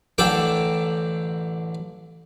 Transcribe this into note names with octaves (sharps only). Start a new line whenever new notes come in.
A1 D3 A4 G5 A5 D6